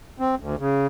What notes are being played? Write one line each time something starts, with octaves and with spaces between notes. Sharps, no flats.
C4
D2
C#3